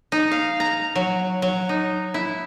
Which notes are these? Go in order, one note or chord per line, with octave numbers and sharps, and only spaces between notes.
D#4
F5
A#5
F#3
F#3
D#4
E4